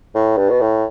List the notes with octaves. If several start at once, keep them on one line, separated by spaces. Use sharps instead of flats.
A2
G2
B2
A2